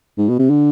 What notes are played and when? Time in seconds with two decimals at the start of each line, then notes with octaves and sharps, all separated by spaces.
0.18 G#2
0.29 B2
0.39 C3
0.50 D3